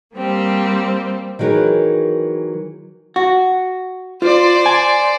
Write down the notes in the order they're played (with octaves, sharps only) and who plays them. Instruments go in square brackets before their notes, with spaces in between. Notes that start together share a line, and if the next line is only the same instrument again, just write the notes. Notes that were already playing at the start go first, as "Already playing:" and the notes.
[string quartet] G3 A#3 C4 G4
[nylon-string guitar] D#3 E3 F#3 G#4 A#4 B4
[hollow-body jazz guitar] F#4
[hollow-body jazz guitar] F4 [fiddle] C5 D5
[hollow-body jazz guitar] G#5